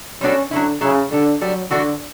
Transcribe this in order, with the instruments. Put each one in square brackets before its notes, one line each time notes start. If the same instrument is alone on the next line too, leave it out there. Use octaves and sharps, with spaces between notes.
[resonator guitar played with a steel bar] G3 B3 D4 F#4 A4 [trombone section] C#4
[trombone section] D3 [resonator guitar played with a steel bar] F#3 C#4 E4
[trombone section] C#3 [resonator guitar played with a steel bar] F#3 C#4 E4
[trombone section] D3 [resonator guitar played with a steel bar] G3 D4 A4
[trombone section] F#3 [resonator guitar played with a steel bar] G3 D4 A4
[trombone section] D3 [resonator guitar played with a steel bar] E3 A3 D4 F#4